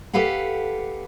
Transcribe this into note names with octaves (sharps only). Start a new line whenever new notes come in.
G4 A4 B4 F5 F#5